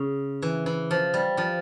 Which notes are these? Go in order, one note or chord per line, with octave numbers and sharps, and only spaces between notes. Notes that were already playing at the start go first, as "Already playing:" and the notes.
Already playing: C#3
E3
E3
F3
G3
F3